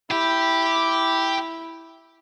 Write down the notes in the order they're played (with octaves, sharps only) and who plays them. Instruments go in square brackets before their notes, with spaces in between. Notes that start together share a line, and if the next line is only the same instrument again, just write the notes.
[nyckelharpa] E4 [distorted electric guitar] G4